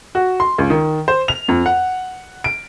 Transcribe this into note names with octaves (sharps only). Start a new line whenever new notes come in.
F#4
C6
C#2
D#3
C5
F7
F2
F#5
D7